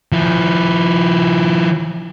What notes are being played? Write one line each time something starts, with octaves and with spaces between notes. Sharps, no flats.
F3 E4